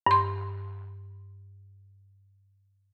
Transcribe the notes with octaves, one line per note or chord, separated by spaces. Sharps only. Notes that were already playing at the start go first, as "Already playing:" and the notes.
G2 C6